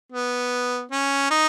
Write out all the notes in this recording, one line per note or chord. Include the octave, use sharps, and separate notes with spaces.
B3
C#4
D#4